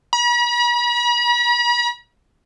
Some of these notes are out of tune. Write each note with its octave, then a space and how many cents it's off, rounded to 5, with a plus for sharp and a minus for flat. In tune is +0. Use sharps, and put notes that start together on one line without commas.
B5 -45